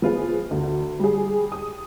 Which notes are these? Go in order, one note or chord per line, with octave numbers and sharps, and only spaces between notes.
F3 B3 F4 G#4
D2
G3 G4 G#4
D#6